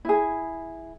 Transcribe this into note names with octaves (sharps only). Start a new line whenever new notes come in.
E4 G#4